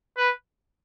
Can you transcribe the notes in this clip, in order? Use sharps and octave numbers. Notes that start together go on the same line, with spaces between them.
B4